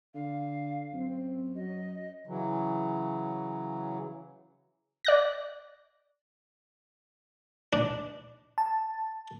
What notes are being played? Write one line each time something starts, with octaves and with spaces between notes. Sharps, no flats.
D3 F5
F#2 C4
F#3 D#5
C#3 E3 F#3
D5 F#6 A#6
D4
A5